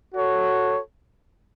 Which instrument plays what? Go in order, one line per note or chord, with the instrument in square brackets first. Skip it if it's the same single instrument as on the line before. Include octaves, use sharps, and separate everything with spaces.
[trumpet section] F#4 A4 C#5